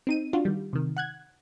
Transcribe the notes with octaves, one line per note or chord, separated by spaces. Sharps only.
C4 D#4 D#7
D4 F4 F#4
D#3 G3
C3 D#3
F#5 F#6 G#6